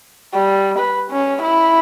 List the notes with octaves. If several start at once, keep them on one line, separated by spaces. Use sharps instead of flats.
G3
B4
C#4
E4